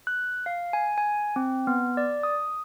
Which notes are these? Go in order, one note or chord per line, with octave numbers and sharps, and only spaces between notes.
F#6
F5
G#5
G#5
C4
B3
D5
D#6